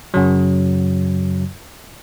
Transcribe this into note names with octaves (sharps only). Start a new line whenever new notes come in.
F#2 C#3 F#3